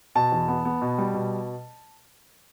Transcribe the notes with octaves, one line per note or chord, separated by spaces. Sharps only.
B2 A5
E2
B3
B3
B2
G3
B2